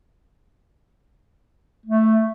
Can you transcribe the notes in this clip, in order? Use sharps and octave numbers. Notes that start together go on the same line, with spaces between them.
A3